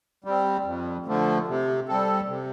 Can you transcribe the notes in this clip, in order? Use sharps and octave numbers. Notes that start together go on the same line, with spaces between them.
G3 C4
F2
D3 F3 A3
C3
G3 C4 A4
C3